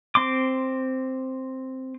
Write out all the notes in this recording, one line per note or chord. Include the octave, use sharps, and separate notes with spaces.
C4 C6 D6